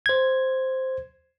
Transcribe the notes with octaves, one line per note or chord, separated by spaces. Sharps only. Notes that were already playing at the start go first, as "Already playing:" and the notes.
C5 G#6